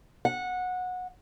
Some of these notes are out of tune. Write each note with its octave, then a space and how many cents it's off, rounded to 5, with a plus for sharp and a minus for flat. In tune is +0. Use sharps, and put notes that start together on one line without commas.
F#5 -20